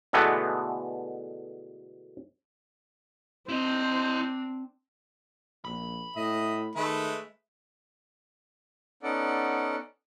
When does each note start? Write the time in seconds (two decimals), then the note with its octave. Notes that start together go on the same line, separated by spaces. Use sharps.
0.13 B2 D3 E3 G#3 A3 B3
3.49 C4 D4 E4 C5 D#5
5.65 A#1 B5
6.16 A2 D#5 E5
6.76 D#3 G#3 A3 B4 E5
9.03 B3 C#4 D#4 A4 D5 F#5